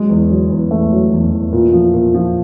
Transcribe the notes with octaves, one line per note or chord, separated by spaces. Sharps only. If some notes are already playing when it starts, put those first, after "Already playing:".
Already playing: F#3 G#3
E2
F#3
E2
E2 A3
F#3
E2
E2
A#2
F3
A#2
F3